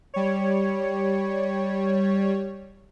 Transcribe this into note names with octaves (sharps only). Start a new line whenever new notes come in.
G3 C#5